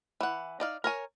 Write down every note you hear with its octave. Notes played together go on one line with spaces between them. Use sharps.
E3 F#5
D#4 D5 F5
A#4 C#5 G#5